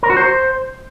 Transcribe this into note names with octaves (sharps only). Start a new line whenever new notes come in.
A#4
F#4
C5